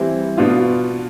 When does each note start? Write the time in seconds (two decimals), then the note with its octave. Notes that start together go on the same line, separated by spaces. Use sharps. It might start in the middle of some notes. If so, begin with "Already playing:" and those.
Already playing: E3 G3 C4 E4
0.38 B2 B3 D4 F4